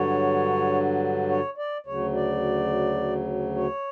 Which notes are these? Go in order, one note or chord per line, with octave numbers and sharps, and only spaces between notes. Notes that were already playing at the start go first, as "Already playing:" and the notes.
Already playing: G2 D3 F#3 C#5
C#5
D5
D2 C#3 F#3 C#5
D5
C#5